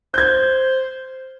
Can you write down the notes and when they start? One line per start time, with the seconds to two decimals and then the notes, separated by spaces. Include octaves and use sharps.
0.14 C5 G6 G#6